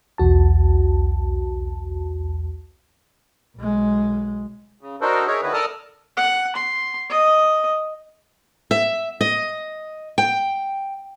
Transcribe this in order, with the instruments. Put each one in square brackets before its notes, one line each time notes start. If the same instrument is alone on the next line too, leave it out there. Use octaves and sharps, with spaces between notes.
[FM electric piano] B1 E2 F#4 A5
[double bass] B1 G#3
[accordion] C#3
D4 D#4 F#4 A4 A#4 C5
D#4 G#4 A#4 C#5 E5
D3 D#3 B3 E4 F#4 B4
A4 A#4 D5 A5 D#6 F6
[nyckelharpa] F#5
C6
D#5
[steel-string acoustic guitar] E5
D#5
G5